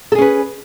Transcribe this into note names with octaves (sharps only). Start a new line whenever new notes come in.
C#4 G#4 A4 B4